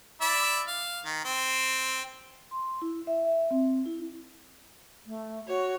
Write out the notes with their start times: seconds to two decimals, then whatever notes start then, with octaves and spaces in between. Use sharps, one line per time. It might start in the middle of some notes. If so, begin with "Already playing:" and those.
0.21 E4 D5 E5
0.68 F5
1.05 D#3
1.25 C4
2.51 C6
2.82 E4
3.07 E5
3.25 E5
3.51 C4
3.86 E4
5.06 A3
5.47 F#4 C#5